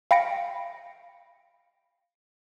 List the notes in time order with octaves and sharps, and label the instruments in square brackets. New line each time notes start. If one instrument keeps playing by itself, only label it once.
[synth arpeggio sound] F5 G5 B5 A#6 C#7 D7